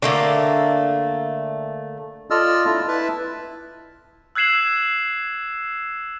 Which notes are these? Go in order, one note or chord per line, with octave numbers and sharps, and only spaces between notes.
D3 A3 A#3
F4 A4 D5 D#5 E6 F6
D4 E4 F4
E4 B4 E5 A5
E6 F#6 G#6 C7 E7 F#7